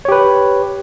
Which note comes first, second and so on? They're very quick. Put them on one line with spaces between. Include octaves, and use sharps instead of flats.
C#5 G4 B4